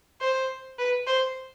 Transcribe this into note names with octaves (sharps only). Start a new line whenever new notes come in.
C5
B4
C5